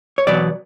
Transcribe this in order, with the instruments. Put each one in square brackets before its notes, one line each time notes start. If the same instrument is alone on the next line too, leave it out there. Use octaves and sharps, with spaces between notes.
[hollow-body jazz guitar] C#5
E2 B2 F#3 B3 D5